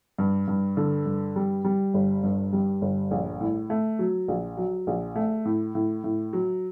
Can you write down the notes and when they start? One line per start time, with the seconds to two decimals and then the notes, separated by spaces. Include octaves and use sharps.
0.18 G2
0.48 G2
0.77 D3
1.06 G2
1.36 G3
1.65 G3
1.94 G1
2.23 G2
2.53 G3
2.82 G1
3.11 A#1
3.41 A2
3.70 A3
3.99 F#3
4.28 A#1
4.57 F#3
4.87 A#1
5.15 A3
5.45 A2
5.75 A2
6.04 A2
6.33 F#3